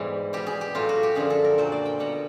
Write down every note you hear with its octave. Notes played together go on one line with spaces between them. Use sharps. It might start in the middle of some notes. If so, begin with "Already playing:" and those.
Already playing: E2 G#2 B2 E3 G3 G#4 D5
B2 G3 G4
G#4
G4
A2 F#3 F4
F#4
G4
F#2 D3 F3 G#4
A4
A#4
A#2 F#3 C5
D5
G5
B2 G3 F#5